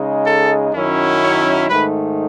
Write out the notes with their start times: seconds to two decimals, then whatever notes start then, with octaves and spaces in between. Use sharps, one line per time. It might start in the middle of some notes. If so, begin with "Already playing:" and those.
Already playing: C#3 G#3 D#4
0.26 A4
0.74 F#2 D#3 F#3 C#4 E4
1.22 C#5
1.70 G#2 D#3 A3 D#4 B4